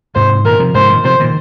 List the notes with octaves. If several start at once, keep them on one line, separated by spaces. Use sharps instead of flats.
G#2 C3 C5
A#2 D#3 A#4
C3 F3
G#2 C3 C5
A#2 D#3
C3 F3 C5
A#2 D#3